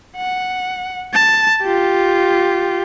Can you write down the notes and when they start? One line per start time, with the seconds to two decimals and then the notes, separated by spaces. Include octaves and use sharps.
0.16 F#5
1.13 A5
1.63 F4 G4